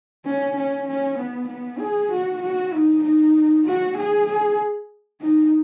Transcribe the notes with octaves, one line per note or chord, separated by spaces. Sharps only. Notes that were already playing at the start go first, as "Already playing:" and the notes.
C#4
C#4
C#4
B3
B3
G#4
F#4
F#4
D#4
D#4
F#4
G#4
G#4
D#4